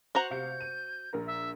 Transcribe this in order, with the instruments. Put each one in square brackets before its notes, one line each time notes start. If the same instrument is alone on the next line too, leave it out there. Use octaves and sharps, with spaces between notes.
[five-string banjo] F#4 C5 A#5 [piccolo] F#5
[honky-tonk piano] C3 F5 C#7 [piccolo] G6
[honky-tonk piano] D#7
A#1 A#4 A#5
[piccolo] E5